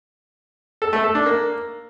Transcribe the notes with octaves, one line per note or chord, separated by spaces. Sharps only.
A4
A3
A4
D4
A#3